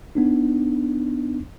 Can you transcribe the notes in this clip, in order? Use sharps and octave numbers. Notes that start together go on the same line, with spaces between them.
B3 D4 D#4